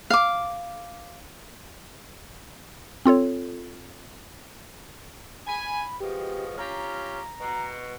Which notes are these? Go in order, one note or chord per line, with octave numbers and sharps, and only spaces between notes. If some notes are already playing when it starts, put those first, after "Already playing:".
F5 D6
C4 F4 A4 C#5
G#5 B5
B2 F3 G#3 G4
C#4 F4 G4 A#5
B2